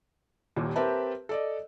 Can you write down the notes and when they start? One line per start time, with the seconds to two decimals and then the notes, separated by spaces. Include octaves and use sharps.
0.56 D#1 D#2 A#2
0.76 C4 G4 A#4 B4 E5 A5
1.29 A4 D5 D#5